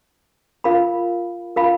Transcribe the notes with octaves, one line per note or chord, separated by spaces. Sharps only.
F4 A#4 F5 B5
F4 A#4 F5 B5